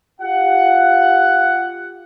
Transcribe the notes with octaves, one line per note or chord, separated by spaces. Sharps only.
F4 G4 F#5